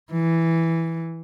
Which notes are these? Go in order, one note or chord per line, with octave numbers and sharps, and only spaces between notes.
E3